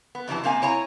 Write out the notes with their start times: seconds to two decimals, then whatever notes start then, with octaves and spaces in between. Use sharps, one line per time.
0.15 B3
0.28 F2 C3 E3 F#3 A5
0.44 C3 A#3 C4 F5 G#5
0.62 E4 C#5 G#5 A#5